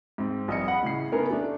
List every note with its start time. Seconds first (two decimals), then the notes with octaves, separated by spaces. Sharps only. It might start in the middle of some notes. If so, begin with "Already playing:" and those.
0.18 G#2 C4
0.48 A#1 G2 D#5 C#7
0.68 F#5 B5
0.83 A2 C#3 C7
1.12 A3 B3 C#4 D#4 A#4 G#5
1.31 A3 D4